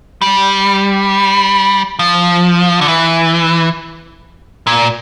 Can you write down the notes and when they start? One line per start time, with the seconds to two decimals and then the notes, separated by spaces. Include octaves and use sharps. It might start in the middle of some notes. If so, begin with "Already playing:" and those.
0.22 G3
1.99 F3
2.81 D3
2.88 E3
4.67 A#2